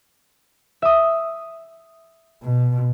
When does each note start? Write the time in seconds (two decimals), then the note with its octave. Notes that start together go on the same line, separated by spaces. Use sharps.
0.82 E5 D#6
2.43 B2